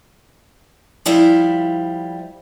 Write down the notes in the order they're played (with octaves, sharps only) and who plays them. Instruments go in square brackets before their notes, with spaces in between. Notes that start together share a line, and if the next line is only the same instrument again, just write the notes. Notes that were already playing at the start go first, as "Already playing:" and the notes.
[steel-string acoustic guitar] F3 G3 E4 E5 F5